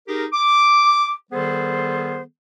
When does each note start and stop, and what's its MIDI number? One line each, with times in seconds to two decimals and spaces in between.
0.08 0.25 63
0.08 0.25 67
0.08 0.25 68
0.08 0.25 70
0.32 1.12 86
1.31 2.21 51
1.31 2.21 55
1.31 2.21 59
1.31 2.21 68
1.31 2.21 69
1.31 2.21 72